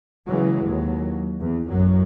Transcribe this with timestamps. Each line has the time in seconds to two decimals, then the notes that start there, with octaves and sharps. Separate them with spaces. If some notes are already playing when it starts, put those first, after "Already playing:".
0.28 C#3 E3 F#3 G#3
0.66 D#2 F#3
1.41 E2
1.70 A1 F#2 F#3